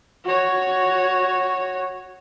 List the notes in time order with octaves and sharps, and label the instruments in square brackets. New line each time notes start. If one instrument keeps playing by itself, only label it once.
[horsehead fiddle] F#4 C#5